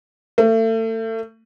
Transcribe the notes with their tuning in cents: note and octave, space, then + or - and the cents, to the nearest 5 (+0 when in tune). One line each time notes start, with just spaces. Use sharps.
A3 +35